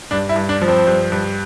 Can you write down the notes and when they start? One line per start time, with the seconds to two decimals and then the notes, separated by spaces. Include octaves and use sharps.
0.11 G2 D4
0.29 E4
0.36 G2
0.49 D4
0.62 F3
0.68 C4
0.87 G2
1.12 G2